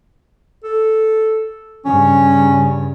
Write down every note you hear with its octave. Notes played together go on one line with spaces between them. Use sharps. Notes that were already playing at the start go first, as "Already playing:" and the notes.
A4
G2 C#3 C#4